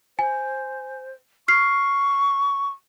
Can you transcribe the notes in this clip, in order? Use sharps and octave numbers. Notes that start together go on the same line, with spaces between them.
C5 G#5
C#6 F6 C7